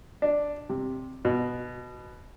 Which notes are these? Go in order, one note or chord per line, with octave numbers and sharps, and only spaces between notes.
D4
C3
B2